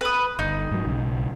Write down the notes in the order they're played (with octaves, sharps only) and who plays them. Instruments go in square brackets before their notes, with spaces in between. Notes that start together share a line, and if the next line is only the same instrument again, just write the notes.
[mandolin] B4 D#6
[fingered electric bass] G1 [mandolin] D#4
[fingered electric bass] G#2 F#3
B1 C#3